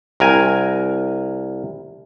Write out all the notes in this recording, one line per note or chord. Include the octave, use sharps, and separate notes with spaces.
C2 A#4 G#5